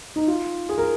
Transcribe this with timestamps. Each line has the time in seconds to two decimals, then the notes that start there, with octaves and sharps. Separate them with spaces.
0.16 D#4
0.27 F4
0.69 G#4
0.78 A#4